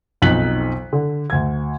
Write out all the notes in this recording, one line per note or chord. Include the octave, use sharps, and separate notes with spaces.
B1 F2 D#4 F#6 B6 F#7
D3
D2 G#6